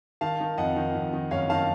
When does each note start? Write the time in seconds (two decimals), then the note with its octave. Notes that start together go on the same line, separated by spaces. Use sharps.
0.21 D#3 F5 A5
0.40 D#3
0.58 F2 D#5 F#5
0.76 D#3
0.95 F2
1.13 D#3
1.31 F#1 C#5 F5
1.50 D#3 F5 A5